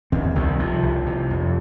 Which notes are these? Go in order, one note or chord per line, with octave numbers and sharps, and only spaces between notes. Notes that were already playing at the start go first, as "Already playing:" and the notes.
D#2 C4
C2 D#3
C3 F3
C2
C3
F2